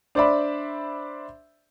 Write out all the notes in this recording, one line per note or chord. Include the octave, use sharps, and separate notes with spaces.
D4 C5 D5 E5 B5